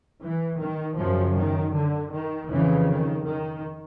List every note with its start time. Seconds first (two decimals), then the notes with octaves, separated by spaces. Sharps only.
0.21 E3
0.59 D#3
0.96 F#2 C#3 F3
1.36 D#3
1.74 D3
2.11 D#3
2.50 F2 C#3 E3
2.88 D#3
3.26 D#3